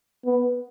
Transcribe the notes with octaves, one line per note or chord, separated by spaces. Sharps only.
B3